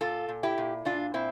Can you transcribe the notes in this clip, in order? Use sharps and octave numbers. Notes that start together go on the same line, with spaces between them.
A#2 F4 A4
A#2
E4 G4
A#2
A#2 D4 F4
A#2 C4 E4